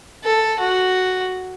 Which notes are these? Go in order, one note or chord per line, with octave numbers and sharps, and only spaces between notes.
A4
F#4